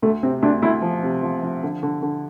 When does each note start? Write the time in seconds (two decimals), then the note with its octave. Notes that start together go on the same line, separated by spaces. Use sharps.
0.02 D2 A3
0.23 C3 C4
0.43 D2 D4
0.62 D2 E4
0.82 F3
1.03 C3
1.23 F3
1.42 F3
1.63 D3
1.83 D3
2.02 D3